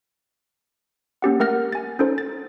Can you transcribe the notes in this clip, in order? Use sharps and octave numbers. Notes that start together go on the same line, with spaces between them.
A#3 C#4 G4 F#5
A3 A#4 F#5 F6 A#6
G#5 A6
C#4 D#4 A4 C5
A6